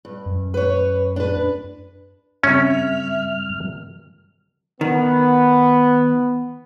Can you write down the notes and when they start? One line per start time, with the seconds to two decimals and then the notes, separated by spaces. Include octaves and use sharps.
0.05 G2
0.26 F#2
0.54 B4 C#5
1.16 D4 B4
2.43 G2 C#3 C4 C#4 G#4 E5 F6
4.81 D#3 B3